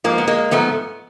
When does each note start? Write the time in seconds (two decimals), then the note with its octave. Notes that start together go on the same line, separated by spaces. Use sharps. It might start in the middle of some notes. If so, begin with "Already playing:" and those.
0.04 G#2 F3 A#3
0.18 B3
0.27 G#3 A#3
0.51 G#2 F3 A3 B3